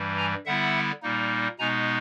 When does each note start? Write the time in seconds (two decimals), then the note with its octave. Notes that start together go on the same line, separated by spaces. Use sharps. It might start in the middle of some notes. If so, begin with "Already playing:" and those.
Already playing: G2 E3 G3
0.18 G#5 A#5
0.46 D3 G3 B3 E4 E5 F#5
1.02 A#2 G3 A#3 D#4
1.59 B2 G#3 B3 D#4 G#5 A#5